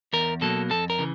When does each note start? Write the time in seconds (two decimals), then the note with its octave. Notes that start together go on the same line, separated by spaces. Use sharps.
0.13 E2 A#4
0.41 B2 F#3 A#3 A4
0.70 F2 A4
0.90 A#4
0.98 C#3 E3